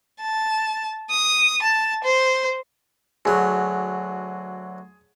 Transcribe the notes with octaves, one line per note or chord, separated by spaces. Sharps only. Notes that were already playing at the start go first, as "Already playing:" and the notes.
A5
D#6
A5
C5
D2 F#3 G#4